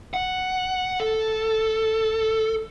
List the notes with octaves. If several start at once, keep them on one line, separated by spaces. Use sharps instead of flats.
F#5
A4